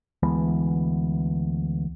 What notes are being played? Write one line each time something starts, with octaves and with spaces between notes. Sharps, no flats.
D2 E3 G#3 B3